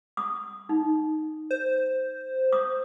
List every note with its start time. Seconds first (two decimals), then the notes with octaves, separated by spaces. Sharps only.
0.17 D#6
0.69 D#4
1.51 C5
2.53 D#6